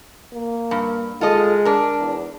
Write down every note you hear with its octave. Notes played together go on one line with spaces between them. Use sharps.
A#3
G2
G#3 F4 A4 D#5
D4 A#4
E2